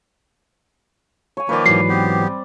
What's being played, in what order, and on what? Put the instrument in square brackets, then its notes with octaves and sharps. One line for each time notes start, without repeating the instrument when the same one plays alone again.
[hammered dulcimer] C#5 G#5
[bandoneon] D#3 F3 A#3 [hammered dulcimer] B4 D5
[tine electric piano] G#2 E3 F#3 [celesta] C7
[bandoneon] B3 G4 [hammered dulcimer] C4
[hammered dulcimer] G3